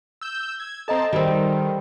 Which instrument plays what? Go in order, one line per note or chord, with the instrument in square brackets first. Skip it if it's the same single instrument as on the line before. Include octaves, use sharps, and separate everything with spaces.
[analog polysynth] E6 G6
G#6
[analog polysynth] C4 A5 [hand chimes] A4 D#5 A#5
[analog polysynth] D#3 [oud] G3 C4